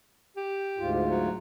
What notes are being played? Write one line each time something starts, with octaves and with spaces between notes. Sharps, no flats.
G4
D2 G#2 F4
F#3